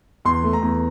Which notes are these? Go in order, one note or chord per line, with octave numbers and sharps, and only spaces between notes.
E2 C6
A3
A#5
E2